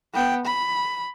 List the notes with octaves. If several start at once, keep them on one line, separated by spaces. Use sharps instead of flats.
B3 G5
B5